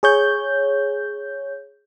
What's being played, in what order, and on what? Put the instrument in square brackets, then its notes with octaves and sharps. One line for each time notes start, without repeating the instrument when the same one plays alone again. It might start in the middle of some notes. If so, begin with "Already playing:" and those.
[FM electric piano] G#4 C#5 G6